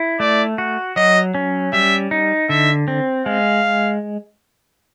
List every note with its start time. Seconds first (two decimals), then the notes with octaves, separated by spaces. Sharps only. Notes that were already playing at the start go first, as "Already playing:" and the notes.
Already playing: E4
0.20 A3 D5
0.58 F#4
0.96 F#3 D#5
1.35 C#4
1.73 G3 E5
2.11 D#4
2.49 D3 E5
2.88 C4
3.26 G#3 F5